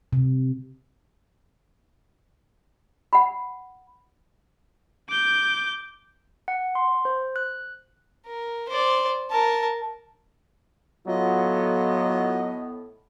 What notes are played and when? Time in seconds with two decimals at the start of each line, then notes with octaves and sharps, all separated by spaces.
0.13 C3
3.13 F#5 B5
5.09 D6 G6
6.48 F#5
6.75 C6
7.05 C5
7.36 F#6
8.27 A#4
8.68 C5 D5
9.30 A#4 A5
11.07 A2 F#3 B3 F4 D#5